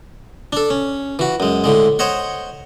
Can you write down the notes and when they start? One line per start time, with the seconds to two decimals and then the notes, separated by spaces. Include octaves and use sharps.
0.53 D4 A4
0.70 C#4
1.19 E3 F#4
1.40 F#2 G#3
1.64 A2 D3 G#3
1.99 C5 C#5 D#5 F#5